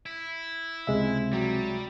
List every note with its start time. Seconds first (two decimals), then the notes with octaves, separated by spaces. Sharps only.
0.06 E4
0.87 C#2 C3 G#3 E5
1.33 F#3 G3